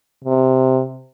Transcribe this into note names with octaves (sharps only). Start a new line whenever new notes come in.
C3